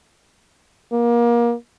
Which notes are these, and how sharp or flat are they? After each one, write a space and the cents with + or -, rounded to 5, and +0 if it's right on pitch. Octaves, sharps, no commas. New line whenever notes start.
A#3 +25